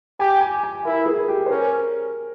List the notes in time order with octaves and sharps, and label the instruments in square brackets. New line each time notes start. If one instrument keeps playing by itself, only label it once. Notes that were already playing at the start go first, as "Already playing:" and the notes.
[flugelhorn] G4 [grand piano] G#5
[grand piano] G#5
G#5
[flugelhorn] E4 [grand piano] A#4
[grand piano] G#4
G4
C5
[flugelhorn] C#4 [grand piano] A#4